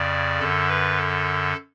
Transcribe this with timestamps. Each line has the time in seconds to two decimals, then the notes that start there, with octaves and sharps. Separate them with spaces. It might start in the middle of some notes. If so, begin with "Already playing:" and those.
Already playing: F2 C#3 D5
0.40 F#2 D3 A4
0.68 B4
0.97 A4